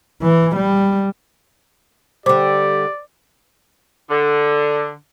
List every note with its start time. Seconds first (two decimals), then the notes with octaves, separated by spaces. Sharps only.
0.23 E3
0.56 G3
2.26 D3 G3 G4 C5 D5 D6
4.10 D3